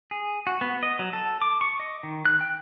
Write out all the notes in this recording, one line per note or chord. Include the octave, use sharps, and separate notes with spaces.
G#4
F#4
B3
D#5
F#3
A4
D6
C#6
D#5
D#3
F#6
G5